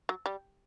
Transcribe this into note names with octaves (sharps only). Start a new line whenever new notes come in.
F#3
G3